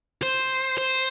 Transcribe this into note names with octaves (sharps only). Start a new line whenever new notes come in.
C5
C5